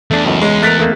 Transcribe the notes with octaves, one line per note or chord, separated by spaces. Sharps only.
E2 A3 D4
C#2 F#2 A2
C#2 G#3
A3 A#4 F#6 A6 B6
D#3 A3 A#3